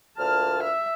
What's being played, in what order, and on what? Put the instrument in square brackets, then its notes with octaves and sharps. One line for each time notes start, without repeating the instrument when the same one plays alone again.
[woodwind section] D2 A#2 F6 [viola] A5
[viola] E5